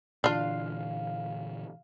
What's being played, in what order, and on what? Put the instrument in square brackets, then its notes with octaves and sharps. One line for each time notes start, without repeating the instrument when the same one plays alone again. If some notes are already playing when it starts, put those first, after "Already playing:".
[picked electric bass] A#2 D3 E3 [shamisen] D4 F4 [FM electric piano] F5